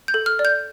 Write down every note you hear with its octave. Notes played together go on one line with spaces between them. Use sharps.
G6
A4
F6
D5
G6